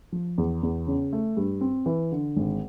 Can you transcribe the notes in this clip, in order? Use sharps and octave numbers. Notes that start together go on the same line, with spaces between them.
F3
E2
E2
C#3
A3
G2
C4
E3
D3
G#1